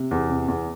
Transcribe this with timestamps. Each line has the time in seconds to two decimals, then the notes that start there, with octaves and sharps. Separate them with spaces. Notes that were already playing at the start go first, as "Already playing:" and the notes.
Already playing: C3
0.11 E2
0.30 C3
0.48 E2